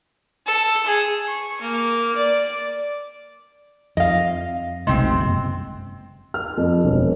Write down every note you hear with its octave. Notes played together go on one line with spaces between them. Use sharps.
A4
G#4
C#6
A#3
D5
F2 D#5 F5
F1 B1 C3 G#3 C4
F#1
F6
F2
E1